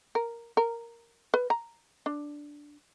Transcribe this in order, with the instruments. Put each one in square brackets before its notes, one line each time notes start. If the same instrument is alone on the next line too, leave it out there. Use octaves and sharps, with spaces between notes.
[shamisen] A#4
A#4
B4
A#5
D4